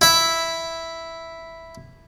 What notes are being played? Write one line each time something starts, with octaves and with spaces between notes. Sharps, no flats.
E4 E5